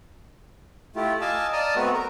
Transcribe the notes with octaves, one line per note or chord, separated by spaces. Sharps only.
A3 E4 F4 G4
D#5 F5 G#5 A5 D6 E6
D5 D#5 A5 A#5 D#6 F6
A3 B3 C4 F#4 B4
A#4 A#5